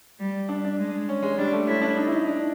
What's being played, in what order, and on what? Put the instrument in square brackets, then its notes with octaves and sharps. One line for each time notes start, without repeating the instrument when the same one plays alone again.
[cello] G3
[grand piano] D4
D4
[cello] G#3
[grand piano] C#4
G#3
[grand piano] G3 [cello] D4
[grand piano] A3
[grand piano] C#4 [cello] E4
[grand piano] D4
D#4
E4
D#4
D4